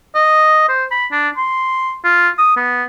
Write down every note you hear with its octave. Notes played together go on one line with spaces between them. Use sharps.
D#5
C5
B5
D4
C6
F4
D#6
B3